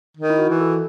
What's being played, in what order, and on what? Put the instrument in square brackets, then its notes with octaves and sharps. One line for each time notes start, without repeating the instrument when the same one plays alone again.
[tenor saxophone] D#3
[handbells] E4
F#4
[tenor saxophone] E3
[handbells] A4